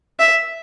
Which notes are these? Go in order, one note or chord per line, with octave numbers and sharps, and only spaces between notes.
E5